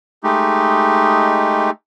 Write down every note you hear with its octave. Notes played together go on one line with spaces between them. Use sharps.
G#3 A3 D#4 G4